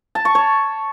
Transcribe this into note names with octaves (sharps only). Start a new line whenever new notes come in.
A5
C#6
C#5